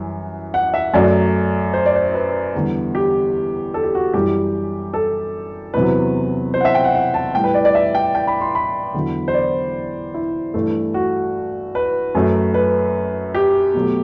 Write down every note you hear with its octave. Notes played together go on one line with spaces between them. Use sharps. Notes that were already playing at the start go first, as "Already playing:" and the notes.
Already playing: F#2 E3 G3
F#5
E5
F#2 F#3 A3 D5
C5
D5
C5
B4
E2 D3 G3
G4
A4
G4
F#4
F#2 E3 G3 G4
A4
E2 C3 F#3 B4
C5
F#5
E5
G5
F#5
F#5
A5
A2 G3 G5
B4
D5
D5
E5
G5
G5
B5
C6
B5
E2 D3 F#3
C5
D5
E4
G2 E3 A3
F#4
B4
F#2 F#3 A3
B4
G4
B2 F#3 A3